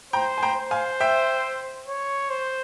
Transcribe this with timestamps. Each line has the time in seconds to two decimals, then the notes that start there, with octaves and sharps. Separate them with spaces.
0.13 C5 G5 A#5
0.38 G#5
0.43 G5 A#5
0.57 C5
0.71 F5 G#5
1.00 E5 G5
1.88 C#5
2.30 C5